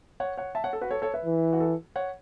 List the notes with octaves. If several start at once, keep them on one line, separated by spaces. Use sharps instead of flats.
C#5 F#5
C#5 F#5
E5 A5
C#5 F#5
A4
F#4 B4
A4 C#5
A4 C#5
B4 E5
E3
F#4
A4
C#5 F#5